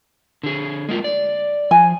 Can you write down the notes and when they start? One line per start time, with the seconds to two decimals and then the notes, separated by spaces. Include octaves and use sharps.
0.43 D3 G#4
0.89 G#3 A#3 F4
1.04 D5
1.71 F3 G#5